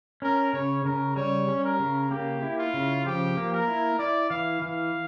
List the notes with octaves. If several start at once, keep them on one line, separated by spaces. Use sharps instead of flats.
C#4 A#4
C#3 C#5
C#3 A#4
G3 C#5
C#4
A#4
C#3
A#3 G4
E4
F4
C#3
F3 G4
A#3
A#4
E4
E4 D5
E3 F5
E3 F5